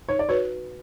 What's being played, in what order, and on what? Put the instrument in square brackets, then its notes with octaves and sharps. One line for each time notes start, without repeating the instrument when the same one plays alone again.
[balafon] D#4 [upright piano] C#5
[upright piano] D5
[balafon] F#4 B4 [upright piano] C#5